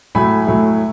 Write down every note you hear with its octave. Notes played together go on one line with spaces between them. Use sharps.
A2 F#3 A3 G#5 B5
A2 F#3 A3